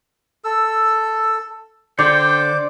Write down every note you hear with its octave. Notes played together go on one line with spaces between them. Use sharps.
A4 E6
D3 C5 D5 G5 D6